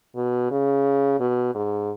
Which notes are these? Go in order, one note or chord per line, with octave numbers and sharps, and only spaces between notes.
B2
C#3
B2
G#2